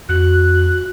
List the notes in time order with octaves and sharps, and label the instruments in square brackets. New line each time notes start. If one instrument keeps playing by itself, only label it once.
[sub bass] F2 [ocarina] F#4 [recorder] F#6